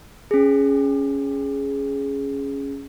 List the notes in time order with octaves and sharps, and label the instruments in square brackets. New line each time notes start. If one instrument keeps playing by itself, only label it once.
[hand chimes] C#4 G#4